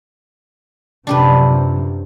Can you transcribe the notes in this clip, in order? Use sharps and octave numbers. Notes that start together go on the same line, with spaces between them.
F#2 C3 F3 D4 G4 B4